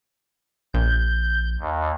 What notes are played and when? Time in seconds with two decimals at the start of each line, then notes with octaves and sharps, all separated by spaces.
0.74 A#1 G6
1.60 D#2